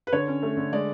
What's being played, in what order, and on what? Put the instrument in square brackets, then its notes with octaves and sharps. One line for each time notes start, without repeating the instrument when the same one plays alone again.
[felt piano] B4
D3 C#5
C#4
A3
D3
G#3 D5